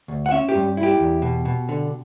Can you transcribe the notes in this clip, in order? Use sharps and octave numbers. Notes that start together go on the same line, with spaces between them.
D2
F#5
C#4 E5
G4
G2
E4
G4
E2
B2
B2
D3